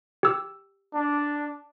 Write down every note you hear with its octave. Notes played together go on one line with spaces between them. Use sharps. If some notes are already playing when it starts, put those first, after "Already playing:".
G4 E6
D4